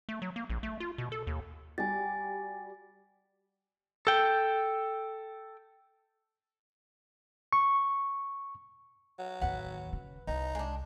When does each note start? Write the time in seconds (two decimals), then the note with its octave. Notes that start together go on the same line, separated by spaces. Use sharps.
0.09 A3
0.22 F#3
0.36 A#3
0.50 A#1
0.63 A3
0.80 F4
0.98 B2
1.12 A4
1.27 D#2
1.78 G3 F#4 G4 G#5 A6
4.07 A4 G5
7.53 C#6
9.19 F#3
9.41 A1 D#2 B4 F#5
9.93 C#3
10.27 C2 D#4
10.55 G#3 D4